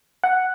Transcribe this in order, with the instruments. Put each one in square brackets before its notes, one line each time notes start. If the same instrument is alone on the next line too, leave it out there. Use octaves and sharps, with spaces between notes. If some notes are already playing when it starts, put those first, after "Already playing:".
[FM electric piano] F#5